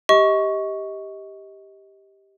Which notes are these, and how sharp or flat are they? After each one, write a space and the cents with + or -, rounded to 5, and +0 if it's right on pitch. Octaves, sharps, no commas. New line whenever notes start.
G4 +0 D#5 +25 C#6 +0